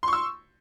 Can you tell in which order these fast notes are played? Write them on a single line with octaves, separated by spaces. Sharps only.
C6 C#6 E6